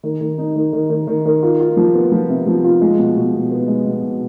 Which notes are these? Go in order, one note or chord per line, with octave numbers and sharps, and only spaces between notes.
D#3
D#3
D#4
D#3
D#3
D#3
D#3
D#3
F4
F4
F3
B3
F3
C3
F3
F4
G#3
B2
B2
B2
B3
G#3
B2
B2